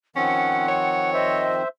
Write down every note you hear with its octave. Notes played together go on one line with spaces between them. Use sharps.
D#3 F3 C4 C#4 F#5
C#5
C5 D#5 E5